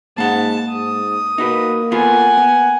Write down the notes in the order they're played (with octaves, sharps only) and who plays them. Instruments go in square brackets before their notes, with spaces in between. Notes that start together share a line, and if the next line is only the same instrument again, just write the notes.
[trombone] G#2 [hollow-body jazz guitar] A#3 F#5 [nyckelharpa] A5
[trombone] G#2 [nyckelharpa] D#6
[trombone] A#3 [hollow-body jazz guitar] D#4 F#4 B4
[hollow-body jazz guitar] B3 F4 A4 [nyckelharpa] F#5 G#5
[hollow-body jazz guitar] B3